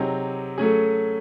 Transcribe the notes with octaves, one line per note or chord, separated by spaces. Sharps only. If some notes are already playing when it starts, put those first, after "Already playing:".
Already playing: C3 F#3 C4 D#4 G#4
F#3 A3 C#4 G#4